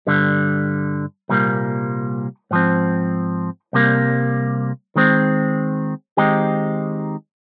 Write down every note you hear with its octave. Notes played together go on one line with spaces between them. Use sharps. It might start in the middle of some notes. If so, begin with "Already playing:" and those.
G2 D3 G3
C2 A#2 G3 A#3
G#2 F3 C4
C2 C3 G3 A#3
D#3 G#3 C4
D#3 G#3 C4 D#4 G4